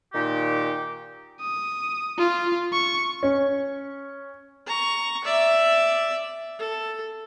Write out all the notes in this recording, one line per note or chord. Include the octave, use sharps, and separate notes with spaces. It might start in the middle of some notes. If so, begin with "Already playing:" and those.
A#2 D#3 G4
D#6
F4
C#6
C#4
A#5 C#6
D5 E5
A4